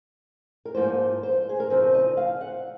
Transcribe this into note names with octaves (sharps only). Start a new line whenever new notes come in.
A#4
G#2 F3 A#3 D#4 C5
C5
G#4
A#4
C#3 F3 C4 D#4 C5
D#5
F5
F#5